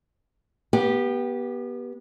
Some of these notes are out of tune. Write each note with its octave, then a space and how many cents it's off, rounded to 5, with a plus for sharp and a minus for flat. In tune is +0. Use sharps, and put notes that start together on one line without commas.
B3 -25 G4 +0